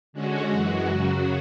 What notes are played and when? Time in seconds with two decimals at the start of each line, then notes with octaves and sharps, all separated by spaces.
0.13 D3 G#3 C#4 F#4
0.49 F#2 E3 G#3 F#4
0.85 F#2 C#3 F#3 F#4